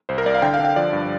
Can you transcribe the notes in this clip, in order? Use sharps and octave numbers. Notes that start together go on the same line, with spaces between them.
C2 C5
A#4
C2 D5
F5
D3 G5
F5
D3
F5
F3 D5
G2